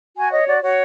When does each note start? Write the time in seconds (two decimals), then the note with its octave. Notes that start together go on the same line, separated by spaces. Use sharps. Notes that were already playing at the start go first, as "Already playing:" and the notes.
0.16 F#4 G#5
0.32 C#5 D#5
0.47 F#4 D5
0.62 F#4 C#5